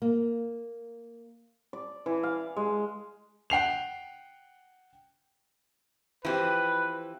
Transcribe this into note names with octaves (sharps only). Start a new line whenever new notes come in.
A#3
D5
E3
F5
G#3
F#5 G5 C7 F7
E3 F3 C4 G4 B4